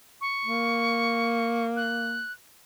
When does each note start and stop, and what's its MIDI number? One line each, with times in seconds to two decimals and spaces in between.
0.21 1.65 85
0.45 2.22 58
1.76 2.32 90